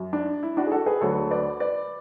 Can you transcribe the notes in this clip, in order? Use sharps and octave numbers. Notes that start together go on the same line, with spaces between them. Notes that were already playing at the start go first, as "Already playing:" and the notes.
Already playing: F#2
D4
E4
D4 F#4
G#4
F#4 A4
G#4 B4
D2 D3 F#3 A4 C#5
B4 D5
B4 D5